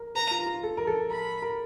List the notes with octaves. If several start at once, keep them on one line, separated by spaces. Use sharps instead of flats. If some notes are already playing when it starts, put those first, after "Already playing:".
Already playing: A#4
B4 A#5
F4
F4
A4
A#4
A4
A#4 B5
A#4